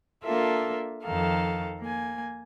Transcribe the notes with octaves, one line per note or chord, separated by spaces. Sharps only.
A#3 D4 F4 A4 A#4 E5
F2 D#3 A4 F5
A#3 G#5